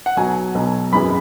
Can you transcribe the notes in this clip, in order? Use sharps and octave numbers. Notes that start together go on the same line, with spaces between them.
F#5
B1 B2 F#3 G#5
B1 B2 F#3
G#1 F#2 E3 G#3 B5